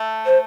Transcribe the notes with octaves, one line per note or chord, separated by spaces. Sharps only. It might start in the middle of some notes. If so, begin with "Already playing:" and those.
Already playing: A3
C5